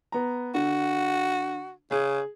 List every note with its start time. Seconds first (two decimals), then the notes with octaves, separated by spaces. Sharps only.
0.12 B3 A#5
0.55 D3 F#4
1.91 C#3 G#4